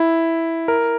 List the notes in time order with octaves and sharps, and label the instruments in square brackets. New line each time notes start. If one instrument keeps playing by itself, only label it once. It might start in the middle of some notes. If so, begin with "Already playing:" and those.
Already playing: [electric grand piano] E4
A#4